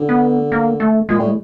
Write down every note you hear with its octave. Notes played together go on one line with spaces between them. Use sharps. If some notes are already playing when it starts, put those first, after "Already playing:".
Already playing: D3
B3
A#3
A3
A#2 G#3
A2 G3
G#3